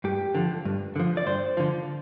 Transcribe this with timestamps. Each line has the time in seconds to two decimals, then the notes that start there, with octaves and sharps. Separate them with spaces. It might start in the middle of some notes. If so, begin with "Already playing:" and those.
0.04 G2 G4
0.35 D3 F3
0.65 G2
0.96 D3 F3
1.17 D5
1.26 G2 C5
1.57 D3 F3